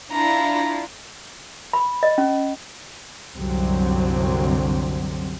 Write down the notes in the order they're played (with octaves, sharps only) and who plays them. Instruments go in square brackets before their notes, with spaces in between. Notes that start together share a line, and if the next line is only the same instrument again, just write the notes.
[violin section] D4 E4 F4 [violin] A#5
[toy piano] B5
D#5
C#4
[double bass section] C2 F#2 D3 F#3 C4